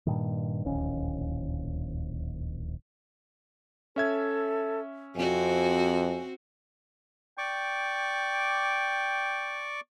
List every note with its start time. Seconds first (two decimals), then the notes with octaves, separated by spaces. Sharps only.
0.06 G2 A#2 D#3
0.65 D1 A#1 D#2 C#4
3.96 C#4 A4 E5 G#6
5.16 F2 C4 F#4 G#5
7.38 D5 G5 C#6 D6